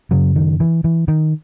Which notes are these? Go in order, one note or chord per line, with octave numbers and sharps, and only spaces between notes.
F#2 C#3 F#3
D#3
E3
E3
D#3